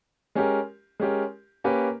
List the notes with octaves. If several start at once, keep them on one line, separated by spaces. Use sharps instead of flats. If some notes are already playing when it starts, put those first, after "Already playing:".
G#3 C#4 G4 A#4
G#3 C#4 G4 A#4
A#3 C#4 G4 B4